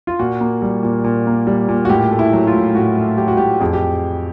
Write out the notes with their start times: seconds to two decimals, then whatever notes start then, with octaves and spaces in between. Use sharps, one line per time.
0.07 F4
0.19 A#2 F#4
0.41 A#3
0.62 G3
0.83 A#2
1.04 A#2
1.27 A#3
1.47 G3
1.69 A#2
1.85 F#4
1.89 A2 G4
2.11 A3
2.19 E4
2.33 F#3
2.47 F4
2.55 A2
2.75 A2 F#4
2.97 A3
3.18 F#3 G4
3.28 F#4
3.37 A2 G4
3.60 F2 G#4
3.73 G4